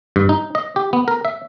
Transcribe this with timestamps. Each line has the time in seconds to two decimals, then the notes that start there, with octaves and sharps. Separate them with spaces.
0.16 G2
0.29 D#4
0.55 D#5
0.76 G4
0.93 B3
1.08 A#4
1.25 E5